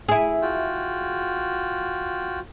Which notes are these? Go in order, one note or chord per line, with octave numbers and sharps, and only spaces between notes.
E4 G#4
F4 F#4 G5